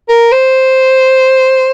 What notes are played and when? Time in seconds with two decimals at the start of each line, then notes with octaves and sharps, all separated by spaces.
0.09 A#4
0.32 C5